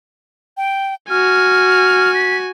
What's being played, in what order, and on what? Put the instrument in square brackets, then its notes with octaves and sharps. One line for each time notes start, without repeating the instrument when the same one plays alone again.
[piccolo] G5
[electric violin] F#4 G#5 [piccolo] F6
[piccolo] B6